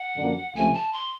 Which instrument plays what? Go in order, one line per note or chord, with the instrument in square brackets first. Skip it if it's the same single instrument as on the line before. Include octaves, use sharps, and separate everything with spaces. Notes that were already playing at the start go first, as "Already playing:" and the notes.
Already playing: [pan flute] F#5
[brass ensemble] F#2 D3 F3 A#3
[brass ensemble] C#2 C3 F3 A3 [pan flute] G#5
[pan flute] A5
C6